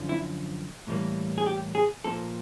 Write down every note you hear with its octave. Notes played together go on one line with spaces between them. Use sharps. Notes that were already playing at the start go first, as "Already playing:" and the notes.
Already playing: F#2 D3 F3
E4
A2 E3 G3 A#3
G#4
G4
G#4
A#2 F3 A#3 A4